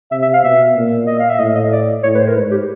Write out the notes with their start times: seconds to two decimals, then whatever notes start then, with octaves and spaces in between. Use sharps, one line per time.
0.12 C3 E5
0.22 E5
0.33 F5
0.43 B2 E5
0.76 A#2
1.07 D#5
1.20 F5
1.30 E5
1.39 A2 D#5
1.55 D#5
1.72 D5
2.03 A2 C#5
2.15 B4
2.20 C5
2.28 A#4
2.35 G#2 B4
2.51 G4